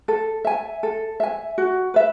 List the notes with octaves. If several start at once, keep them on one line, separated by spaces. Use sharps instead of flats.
A4
E5 G#5
A4
E5 G#5
F#4
B4 E5